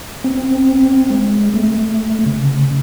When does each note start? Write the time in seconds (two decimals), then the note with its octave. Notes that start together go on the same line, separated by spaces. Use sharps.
0.24 C4
1.10 G#3
1.54 A3
2.26 C#3